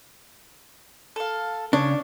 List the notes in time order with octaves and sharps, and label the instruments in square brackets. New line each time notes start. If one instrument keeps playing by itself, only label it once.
[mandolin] A4 F5
[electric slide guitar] C#3 [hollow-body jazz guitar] D4 [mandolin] C#5